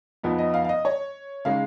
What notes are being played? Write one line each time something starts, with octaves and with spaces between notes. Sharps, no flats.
F2 F3 B3 D#4
D#5
F5
F5
D#5
C#5
C#3 G#3 D#4 F5